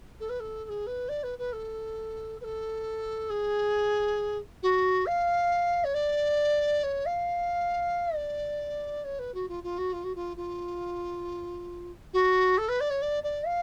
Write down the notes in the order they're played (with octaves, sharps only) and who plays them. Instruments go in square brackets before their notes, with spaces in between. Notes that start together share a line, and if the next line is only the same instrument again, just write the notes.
[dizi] A4
B4
A4
A4
G#4
B4
D5
B4
B4
A4
B4
A4
G#4
F#4
F5
C#5
D5
C#5
F5
D5
C#5
B4
F#4
F4
F4
F#4
F4
F#4
F4
F4
F#4
A4
B4
D5
C#5
D5
D5
F5